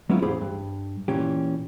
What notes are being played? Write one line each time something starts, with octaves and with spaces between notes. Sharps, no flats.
F#3 G#3 B3 C#4 E4 F4
E2 A2 G4 G#4 C5 B5
G2
A#2 E3 C#4 G4